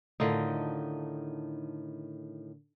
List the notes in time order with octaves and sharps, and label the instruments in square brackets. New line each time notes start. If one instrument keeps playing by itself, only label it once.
[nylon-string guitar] A2 D#3 F4 [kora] D3 D#4